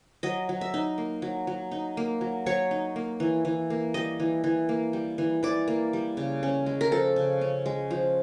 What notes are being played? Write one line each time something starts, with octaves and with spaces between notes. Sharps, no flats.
F#3 D#5
F#3
E5
D#4
A#3
F#3
F#3
D#4
A#3
F#3
F#3 C#5
D#4
A#3
E3
E3
A#3
G3 D#5
E3
E3
A#3
G3
E3
E3 D5
A#3
G3
C#3
C#4
G#3
A#4
F3 A4
C#3
C#4
G#3
F3